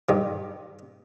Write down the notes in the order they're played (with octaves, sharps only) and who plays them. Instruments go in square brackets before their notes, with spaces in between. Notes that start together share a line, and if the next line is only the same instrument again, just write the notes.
[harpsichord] G2 D#3